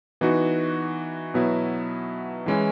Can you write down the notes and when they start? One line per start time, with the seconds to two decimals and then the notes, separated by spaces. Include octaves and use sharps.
0.21 E3 B3 D#4 F#4
1.34 B2 F#3 B3 E4
2.46 E3 G#3 C#4 E4